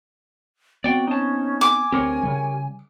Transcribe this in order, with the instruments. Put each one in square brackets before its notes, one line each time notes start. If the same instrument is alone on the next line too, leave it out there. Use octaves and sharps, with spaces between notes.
[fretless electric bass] B3 C4 [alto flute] F#4 [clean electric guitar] D5 G5
[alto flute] C#4 [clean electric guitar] D#4 A5
[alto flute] G#5 [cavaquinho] D6
[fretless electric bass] D2 C4 [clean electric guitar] G4 A#4 C#5
[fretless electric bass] C#3 G3